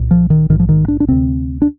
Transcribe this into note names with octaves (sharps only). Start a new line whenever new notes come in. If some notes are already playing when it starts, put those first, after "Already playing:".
Already playing: C2 A#2
F3
D#3
A#1 G#2 D#3
F3
D#3
D4
D4
D2 C3 C4
D4